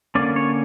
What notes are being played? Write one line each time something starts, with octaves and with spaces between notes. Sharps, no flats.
D3 A#3 C#4 D5
C#5